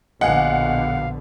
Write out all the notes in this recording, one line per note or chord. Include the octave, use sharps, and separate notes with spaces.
A#1 B2 D3 D#5 F5 F#5 G#5